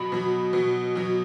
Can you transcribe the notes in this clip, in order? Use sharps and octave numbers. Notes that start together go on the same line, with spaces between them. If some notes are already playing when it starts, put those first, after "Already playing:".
Already playing: B2 F#3 B5
B2 F#3
B2 F#3
B2 F#3